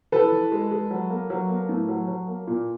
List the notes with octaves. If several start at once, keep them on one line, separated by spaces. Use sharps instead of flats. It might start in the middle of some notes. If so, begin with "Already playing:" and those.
E3 A4 B4
E3
G#3
G#3
F#3
A#3
F#3
A#3
A2
F#3
F#3
A#3
A#2